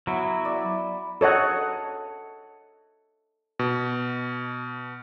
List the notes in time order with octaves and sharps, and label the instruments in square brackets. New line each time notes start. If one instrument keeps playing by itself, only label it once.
[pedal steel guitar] F#3 E4 [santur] B3
[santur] D5 E5 B5
[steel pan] A4 C#5 D#5 F#5
[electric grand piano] B2